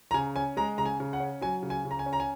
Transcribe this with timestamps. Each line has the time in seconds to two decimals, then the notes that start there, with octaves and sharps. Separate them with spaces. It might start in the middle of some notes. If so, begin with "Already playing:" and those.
0.11 A#5
0.14 C#3 G#5
0.36 C#4 G#5
0.57 G#3 A#5
0.78 C#3 A#5
0.86 G#5
1.00 C#3
1.13 F#5
1.20 C#4
1.41 F#3 G#5
1.63 C#3
1.70 G#5
1.85 C#3
1.91 A#5
1.99 G#5
2.06 C#4
2.13 A#5
2.20 G#5